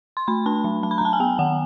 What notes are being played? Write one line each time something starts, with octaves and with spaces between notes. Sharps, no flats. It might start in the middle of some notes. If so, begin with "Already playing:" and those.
C6
A3 B5
D4 A5
F#3
F#3 A5
B5
A#5
F#3 A5
G#5
B3 G5
D#3 F#5